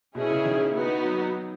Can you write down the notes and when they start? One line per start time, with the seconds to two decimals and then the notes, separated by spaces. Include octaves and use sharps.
0.15 B2 C#4 E4 G#4
0.30 C#3
0.45 D#3
0.75 B3 D#4 F#4
1.05 F#3